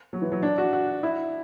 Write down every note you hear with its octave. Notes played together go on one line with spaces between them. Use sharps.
F#3
E3
F#3
D4
F#4
F#4
E4